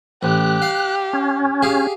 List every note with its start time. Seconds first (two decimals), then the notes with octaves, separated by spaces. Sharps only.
0.23 A1 G4 F#6
0.62 F5
1.13 C#4
1.62 G4 G#4 F5